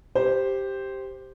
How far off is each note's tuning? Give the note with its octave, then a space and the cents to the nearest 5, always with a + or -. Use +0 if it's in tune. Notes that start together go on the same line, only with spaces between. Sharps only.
G4 +0 C5 +0